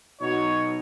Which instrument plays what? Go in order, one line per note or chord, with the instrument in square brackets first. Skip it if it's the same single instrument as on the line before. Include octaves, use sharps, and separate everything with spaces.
[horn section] B2 F#3 D#4 C#5